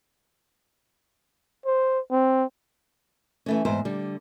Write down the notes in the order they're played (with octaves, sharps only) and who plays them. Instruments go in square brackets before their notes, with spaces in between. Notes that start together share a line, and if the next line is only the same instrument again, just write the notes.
[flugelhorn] C5
C4
[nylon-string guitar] E3 A3 C#4
E2 G#2 C4 C5
D3 G3